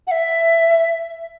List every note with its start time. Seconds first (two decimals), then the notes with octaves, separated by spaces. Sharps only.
0.07 F#5
0.11 E5